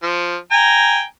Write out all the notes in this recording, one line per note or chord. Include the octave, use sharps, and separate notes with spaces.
F3
G5 G#5 A#5